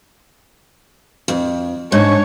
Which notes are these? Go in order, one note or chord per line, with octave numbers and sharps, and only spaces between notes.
F2
G#2 D4 C#5